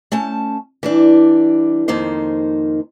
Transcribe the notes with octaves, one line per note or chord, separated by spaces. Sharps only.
A3 C#4 A5
E3 G3 D4
F2 D#3 A#3 D#4 C5